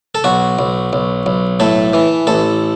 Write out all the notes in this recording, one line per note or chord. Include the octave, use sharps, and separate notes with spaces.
A4
B1 F#4
B1
B1
B1
A2 A4
E3
A1 A4